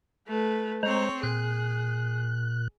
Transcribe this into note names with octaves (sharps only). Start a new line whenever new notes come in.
A3 B4
G#3 C4 C5 C#5 A#5
A#2 G#4 F#6